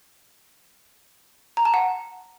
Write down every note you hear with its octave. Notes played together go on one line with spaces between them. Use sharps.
A#5
A5
F#5